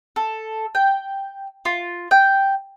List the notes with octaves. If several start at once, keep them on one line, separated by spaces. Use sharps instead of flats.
A4
G5
F4
G5